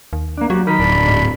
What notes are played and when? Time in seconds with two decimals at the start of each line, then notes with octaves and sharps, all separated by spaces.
0.13 D#2
0.38 A#3 D4
0.50 F#3 A#3 F#4 G4
0.67 D#3 D#4 A#4 B5
0.80 D1 D4
1.08 G#2